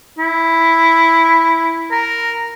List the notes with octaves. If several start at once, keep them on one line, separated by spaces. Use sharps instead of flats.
E4
A#4